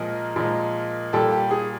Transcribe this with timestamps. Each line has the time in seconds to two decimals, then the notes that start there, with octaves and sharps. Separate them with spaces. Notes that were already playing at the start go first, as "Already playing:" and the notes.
Already playing: A#2 F3 G#3 G#4 A#4
0.36 A#2 F3 G#3
1.13 A#2 G3 G4 A4
1.32 G4
1.51 G#4